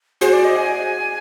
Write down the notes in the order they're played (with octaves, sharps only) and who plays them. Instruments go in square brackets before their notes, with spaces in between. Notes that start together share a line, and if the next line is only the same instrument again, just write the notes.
[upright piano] F#4 G#4 [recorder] C5
[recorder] D5
D#5
G#5